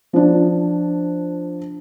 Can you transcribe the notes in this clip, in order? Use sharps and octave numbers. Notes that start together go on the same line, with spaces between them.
F3 D4